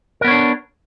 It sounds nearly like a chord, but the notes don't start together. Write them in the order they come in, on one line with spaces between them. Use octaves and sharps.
A#4 B3 C#5 D4